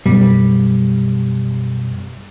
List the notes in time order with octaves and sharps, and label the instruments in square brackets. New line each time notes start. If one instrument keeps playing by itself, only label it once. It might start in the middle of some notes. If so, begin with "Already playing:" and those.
[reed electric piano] F#2 B2 [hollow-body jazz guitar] G3